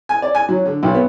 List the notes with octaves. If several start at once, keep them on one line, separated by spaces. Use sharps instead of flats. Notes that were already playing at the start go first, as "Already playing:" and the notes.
G#5
D5
G#5
F#3
D3
B1
B3